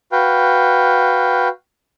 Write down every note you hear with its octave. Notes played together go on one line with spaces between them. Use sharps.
F#4 B4 F5 G5